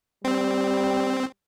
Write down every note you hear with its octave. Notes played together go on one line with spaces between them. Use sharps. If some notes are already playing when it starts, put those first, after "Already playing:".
G3 C4